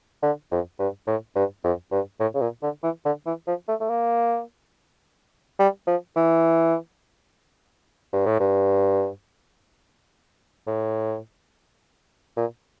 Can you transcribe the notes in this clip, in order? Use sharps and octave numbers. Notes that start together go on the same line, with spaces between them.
D3
F2
G2
A2
G2
F2
G2
A2
C#3
A#2
D3
E3
D3
E3
F3
A3
A3
A#3
G3
F3
E3
G2
A2
G2
A2
A#2